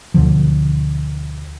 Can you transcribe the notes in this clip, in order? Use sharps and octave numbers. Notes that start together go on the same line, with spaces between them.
D2 B2 D3 F3